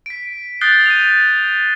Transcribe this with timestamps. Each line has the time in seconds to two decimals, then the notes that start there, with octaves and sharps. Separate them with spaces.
0.06 B6 D7
0.61 D#6 F#6 G6 A6 C7 G7
0.86 D#7 F7